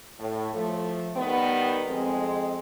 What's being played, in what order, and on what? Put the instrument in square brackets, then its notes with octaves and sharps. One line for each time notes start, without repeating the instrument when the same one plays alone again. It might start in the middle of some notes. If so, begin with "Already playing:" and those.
[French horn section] A2
F3 A3
D#3 G3 B3
F2 G#3 C4